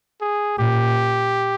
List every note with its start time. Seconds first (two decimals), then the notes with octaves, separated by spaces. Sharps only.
0.21 G#4
0.58 A#2 G4